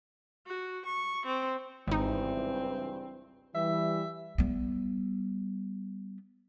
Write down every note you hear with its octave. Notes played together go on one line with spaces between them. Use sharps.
F#4
C#6
C4
G#1 C#2 G2 E3 C4 D#4
E3 G3 E5
G3 B3